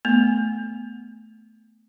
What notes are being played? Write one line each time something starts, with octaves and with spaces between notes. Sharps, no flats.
A3 B3